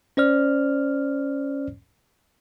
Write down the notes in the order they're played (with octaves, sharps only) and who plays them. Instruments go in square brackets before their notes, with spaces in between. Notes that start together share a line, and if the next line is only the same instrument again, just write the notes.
[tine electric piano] C#4 C5 D5 F6